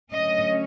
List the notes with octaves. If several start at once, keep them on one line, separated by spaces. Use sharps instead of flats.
D3 F#3 A3 C#4 D#5